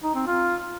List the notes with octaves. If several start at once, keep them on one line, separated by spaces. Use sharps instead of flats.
D#4
C4
F4